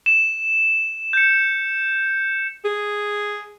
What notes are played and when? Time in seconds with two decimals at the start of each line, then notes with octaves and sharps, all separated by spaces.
0.06 E7
1.13 G6 C#7
2.65 G#4